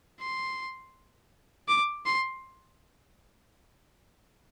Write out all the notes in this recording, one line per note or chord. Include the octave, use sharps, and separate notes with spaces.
C6
D6
C6